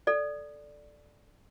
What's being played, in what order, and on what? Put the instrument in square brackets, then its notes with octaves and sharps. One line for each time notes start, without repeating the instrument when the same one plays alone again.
[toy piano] A4 D5